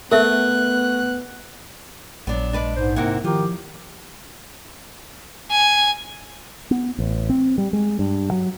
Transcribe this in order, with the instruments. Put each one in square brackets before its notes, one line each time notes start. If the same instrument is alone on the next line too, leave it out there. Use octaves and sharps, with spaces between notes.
[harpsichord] A3 [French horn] B3 [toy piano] A#4 E5 [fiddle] F#6
[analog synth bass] A#1 [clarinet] F#3 [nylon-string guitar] B3 D4
[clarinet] G#3 [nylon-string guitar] D4 B4 D5
[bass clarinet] G#2 [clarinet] C5
[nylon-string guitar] C3 A#3 E4 [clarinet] F#5
[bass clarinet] D#3 [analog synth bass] F3 [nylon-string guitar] F4 [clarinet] G4
[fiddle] G#5
[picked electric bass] B3
A1
C4
G3
G#3
G2
F#3